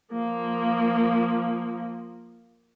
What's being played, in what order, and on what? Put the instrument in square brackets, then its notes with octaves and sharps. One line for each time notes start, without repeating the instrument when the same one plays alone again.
[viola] F3 A#3